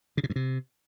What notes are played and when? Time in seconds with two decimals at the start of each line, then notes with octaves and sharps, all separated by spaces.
0.17 C#3
0.23 C3
0.30 G2
0.36 C3